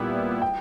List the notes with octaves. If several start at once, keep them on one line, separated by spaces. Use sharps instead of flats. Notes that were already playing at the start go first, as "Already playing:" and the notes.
Already playing: A#2 G3 B3 E4
G5